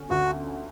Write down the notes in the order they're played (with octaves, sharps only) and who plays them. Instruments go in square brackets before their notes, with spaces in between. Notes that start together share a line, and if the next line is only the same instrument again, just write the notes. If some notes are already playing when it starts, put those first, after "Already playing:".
Already playing: [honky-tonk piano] D3 C#4
[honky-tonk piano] D2 [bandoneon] F#4